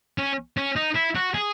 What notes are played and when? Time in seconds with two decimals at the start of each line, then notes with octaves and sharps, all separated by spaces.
0.18 C#4
0.57 C#4
0.76 D#4
0.95 E4
1.15 F#4
1.34 G#4